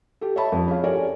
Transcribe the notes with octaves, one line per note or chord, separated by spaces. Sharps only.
G4 A4
C#5 D#5 E5 A5 B5
F2
C#4 G#4 F5
G4 A4 A#4 C#5 D5 G#5